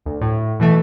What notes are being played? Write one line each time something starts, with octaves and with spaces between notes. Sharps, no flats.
D2
A2
B2 E3 A3